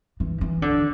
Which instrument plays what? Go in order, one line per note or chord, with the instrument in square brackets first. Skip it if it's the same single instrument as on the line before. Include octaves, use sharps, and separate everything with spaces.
[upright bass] E3
E3
D3